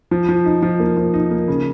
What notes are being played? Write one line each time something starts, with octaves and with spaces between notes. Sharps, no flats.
F3
F3
D#4
F3
A#3
F3
D#4
A#3
C#3